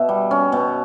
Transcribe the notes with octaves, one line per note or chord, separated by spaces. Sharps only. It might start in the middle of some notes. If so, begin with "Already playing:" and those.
Already playing: B2 E5
G3
C#4
B2